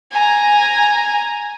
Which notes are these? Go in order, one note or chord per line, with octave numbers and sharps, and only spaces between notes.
G#5 A#5